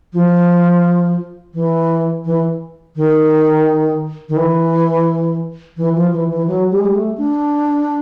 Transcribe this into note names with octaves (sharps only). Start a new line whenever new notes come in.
F3
E3
E3
D#3
D#3
E3
E3
F3
E3
E3
F#3
G3
G#3
G3
A3
D4